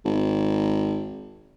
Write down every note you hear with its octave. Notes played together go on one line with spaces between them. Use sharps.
G#1